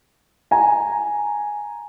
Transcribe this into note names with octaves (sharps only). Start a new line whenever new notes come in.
G#5 A#5